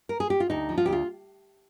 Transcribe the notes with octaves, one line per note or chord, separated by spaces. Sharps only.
A#4
G#4
G4
F4
D2 D#4
F3
F4
D2 G4
F4